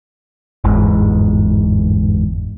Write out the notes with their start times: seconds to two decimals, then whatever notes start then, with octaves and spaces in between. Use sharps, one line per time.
0.64 G1 E2 G#2